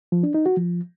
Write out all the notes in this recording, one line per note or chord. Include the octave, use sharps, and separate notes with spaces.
F3
D4
D#4
F#4
F3